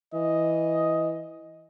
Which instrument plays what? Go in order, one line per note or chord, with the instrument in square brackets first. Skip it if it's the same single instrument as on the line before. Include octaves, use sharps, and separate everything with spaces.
[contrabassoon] E3 [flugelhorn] D#5